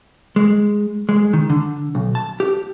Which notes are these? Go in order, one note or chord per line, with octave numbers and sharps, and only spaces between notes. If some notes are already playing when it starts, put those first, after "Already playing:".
G#3
G#3
D#3
D3
B1
A5
G4